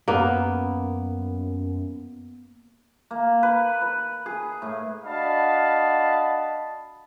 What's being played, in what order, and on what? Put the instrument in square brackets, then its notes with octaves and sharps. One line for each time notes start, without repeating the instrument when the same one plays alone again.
[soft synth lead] F#2 [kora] A#3 B3
[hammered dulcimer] A#3
B4
B4
G#4
A2
[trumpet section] D4 F#4 D#5 F5 A5 B5